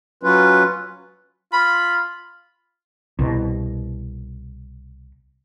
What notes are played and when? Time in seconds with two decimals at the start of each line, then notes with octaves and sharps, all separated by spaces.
0.23 F#3 C#4 F4 B4
1.53 F4 B5
3.19 C2 B2